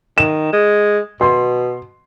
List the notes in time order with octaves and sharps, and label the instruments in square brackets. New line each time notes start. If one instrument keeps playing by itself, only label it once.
[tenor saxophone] D#3 [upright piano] E7
[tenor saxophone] G#3
[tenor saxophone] B2 [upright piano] C6